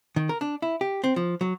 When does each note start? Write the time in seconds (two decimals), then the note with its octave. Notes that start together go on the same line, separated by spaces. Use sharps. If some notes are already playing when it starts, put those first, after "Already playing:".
0.16 D#3
0.29 A#4
0.41 D4
0.62 E4
0.81 G4
1.04 C4
1.16 F3
1.41 F#3